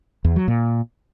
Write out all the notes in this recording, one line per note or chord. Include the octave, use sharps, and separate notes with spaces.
E2
F#3
A#2